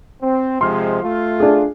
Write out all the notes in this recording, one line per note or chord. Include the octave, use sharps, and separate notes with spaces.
C4
C3 F3 G#3 C6 F6
A3 F4
D4 G#4